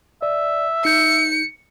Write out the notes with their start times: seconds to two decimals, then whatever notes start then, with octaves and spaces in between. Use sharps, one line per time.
0.22 D5 E5
0.85 D#4 G6 C#7